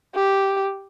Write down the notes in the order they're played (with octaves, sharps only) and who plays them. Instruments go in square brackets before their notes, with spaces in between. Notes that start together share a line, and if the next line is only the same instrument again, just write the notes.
[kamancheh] G4